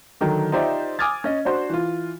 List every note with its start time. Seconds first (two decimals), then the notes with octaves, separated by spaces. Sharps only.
0.21 D3 D#3 F#3
0.52 D#4 F4 G4 C5 D5 E5
0.99 G#5 D6 D#6 F6 G#6 A6
1.24 C#4 D#5
1.45 D4 F#4 C5 C6
1.70 E3 F4